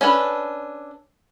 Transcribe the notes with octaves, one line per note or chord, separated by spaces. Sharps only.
C#4 D4 A4 B4